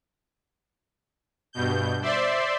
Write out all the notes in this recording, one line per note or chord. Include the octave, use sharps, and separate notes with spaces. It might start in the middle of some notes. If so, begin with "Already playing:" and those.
G2 B2 G6
C5 D5 E5 C6